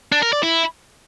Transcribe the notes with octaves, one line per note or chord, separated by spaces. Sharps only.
D4
A#4
D5
E4